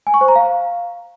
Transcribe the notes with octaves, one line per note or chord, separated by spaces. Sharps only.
G#5
C#6
C5
A#5
F5